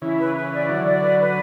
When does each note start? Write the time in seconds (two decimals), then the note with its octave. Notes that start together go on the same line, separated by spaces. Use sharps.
0.02 C#3 E3 E4
0.19 B4
0.35 B4
0.53 D5
0.69 D3 F#3 E4
0.86 D5
1.02 B4
1.20 B4